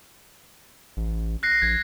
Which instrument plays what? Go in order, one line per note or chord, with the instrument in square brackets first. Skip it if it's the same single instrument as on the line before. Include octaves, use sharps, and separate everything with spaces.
[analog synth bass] A1
[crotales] F#6 A#6 C7
[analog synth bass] A#1 [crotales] G#6